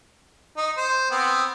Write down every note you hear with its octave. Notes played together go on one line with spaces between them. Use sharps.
D#4
C5
B3 C4